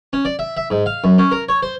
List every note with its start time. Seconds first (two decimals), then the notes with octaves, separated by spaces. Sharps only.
0.13 C#4
0.25 D5
0.39 E5
0.57 E5
0.70 G#2
0.86 F5
1.04 F#2
1.18 C#4
1.31 A#4
1.49 C#5
1.63 C5